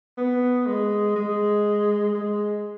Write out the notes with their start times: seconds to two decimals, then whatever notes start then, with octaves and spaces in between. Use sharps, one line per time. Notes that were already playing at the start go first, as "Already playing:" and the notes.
0.18 B3
0.67 G#3
1.16 G#3
2.14 G#3